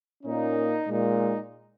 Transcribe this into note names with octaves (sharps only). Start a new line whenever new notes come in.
A#2 A#3 C#4 D#4
A#2 G#3 D#4